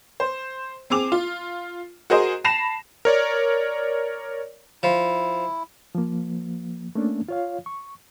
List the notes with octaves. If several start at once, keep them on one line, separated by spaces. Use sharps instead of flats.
C5
C4 G#4 D6 F7
F4
F#4 G#4 A#4 C5 D#5
A5 B5 A#6 C7 E7 F7
A#4 C#5 D5
F3 E4
F3 A#3
A3 A#3 C#4 D4
F4 C#5 F5
C#6